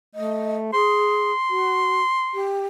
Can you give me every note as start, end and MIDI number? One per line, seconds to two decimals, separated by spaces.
0.15 0.73 57
0.15 0.57 75
0.73 1.31 68
0.73 2.51 84
1.50 2.02 66
2.34 2.67 67